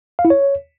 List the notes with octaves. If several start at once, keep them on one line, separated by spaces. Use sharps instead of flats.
F5
E4
C#5